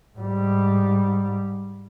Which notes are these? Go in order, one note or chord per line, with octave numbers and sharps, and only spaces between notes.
G#2 G3